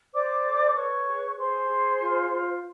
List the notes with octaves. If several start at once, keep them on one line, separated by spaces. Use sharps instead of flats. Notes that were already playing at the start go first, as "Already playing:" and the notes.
C5 D5 D6
A4
B4 C#5 C#6
G#4
G#4 C5 C6
G#4
F4
F4